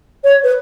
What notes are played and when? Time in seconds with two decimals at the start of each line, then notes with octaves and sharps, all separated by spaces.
0.24 C#5
0.43 B4